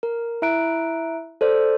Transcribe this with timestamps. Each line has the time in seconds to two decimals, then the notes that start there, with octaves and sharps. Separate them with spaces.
0.03 A#4
0.42 E4 E5 A#5 F#6 D7
1.41 A4 C5 D5